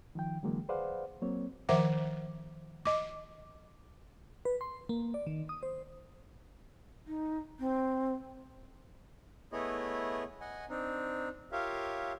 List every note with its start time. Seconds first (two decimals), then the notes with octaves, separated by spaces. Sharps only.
0.15 D#3 F3 G5
0.43 D3 E3 F#3 G#3 A#3
0.69 G#4 B4 C5 D5 F5 F#5
1.22 F#3 A#3 C4 C#5
1.69 D#3 F3 C5 E5 F#5 D6
2.85 D#5 D6
4.45 B4
4.61 C6
4.89 A#3
5.14 D5
5.27 D#3
5.49 D#6
5.63 C5
7.07 D#4
7.59 C4
9.52 A3 B3 E4 G#4 C#5 D#5
10.41 D#5 F#5 G#5
10.69 C4 D4 D#4
11.52 F4 G4 A#4 C#5 E5 F5